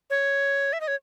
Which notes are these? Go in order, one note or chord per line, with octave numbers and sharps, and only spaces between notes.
C#5
E5
D#5
C#5